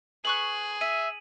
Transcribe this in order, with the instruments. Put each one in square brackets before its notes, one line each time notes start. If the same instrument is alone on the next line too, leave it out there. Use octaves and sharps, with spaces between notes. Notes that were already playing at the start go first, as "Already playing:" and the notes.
[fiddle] G#4 [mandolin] B4 C#6 F#6 [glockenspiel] F#7
[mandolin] E5 [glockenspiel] D#7